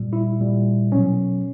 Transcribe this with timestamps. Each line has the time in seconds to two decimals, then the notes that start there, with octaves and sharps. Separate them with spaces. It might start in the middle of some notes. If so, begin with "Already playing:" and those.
Already playing: A#2 G3
0.13 E4
0.40 A#2 G3
0.92 B2 F#3 C#4